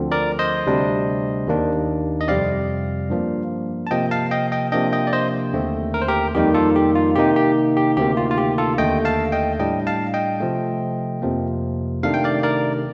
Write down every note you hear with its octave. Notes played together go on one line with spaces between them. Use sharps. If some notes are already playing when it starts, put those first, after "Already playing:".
Already playing: D2 D3 F3 C4
A#4 D5
C5 D#5
D2 C3 G3 D4
D#2 D#3 A#3 D4
D#5
F2 C3 G3 C4 D5 F5
G2 F3 A#3
A5
C3 F3 A#3 D#5 G5
F5 A5
D#5 G5
D#5 G5
C3 F3 A#3 D4 D#5 G5
D#5 G5
D5
C5 D#5
D#2 D3 A3 C4
A#4
C5
G4 A#4
F2 D#3 G3 A#3 D#4 G4
F4 A4
G4
F4
C3 D#3 A#3 D#4 G4
G4
G4
D2 C3 D#3 A#3 G4
F4
F4
G4
F4 A4
D#2 D3 A3 D#5 G5
F5 A5
D#5 G5
A2 G3 D4 D#5 G5
F5 A5
D#5 G5
C3 F3 A3
F2 C3 F3 A#3
C3 D#3 A3 D4 F5
G5
D5 F5
A#4 D5